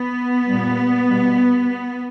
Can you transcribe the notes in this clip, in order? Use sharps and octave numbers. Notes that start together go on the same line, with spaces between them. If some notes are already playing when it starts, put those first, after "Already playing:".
Already playing: B3
G3
A#2
B2 G3